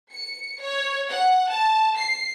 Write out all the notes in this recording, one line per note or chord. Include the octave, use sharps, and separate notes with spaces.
C#7
C#5
F#5
A5
C7